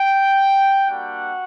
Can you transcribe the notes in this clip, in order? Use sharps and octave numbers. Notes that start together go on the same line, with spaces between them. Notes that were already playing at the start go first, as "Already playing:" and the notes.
Already playing: G5
G3 A#3 D4 F#4 F#5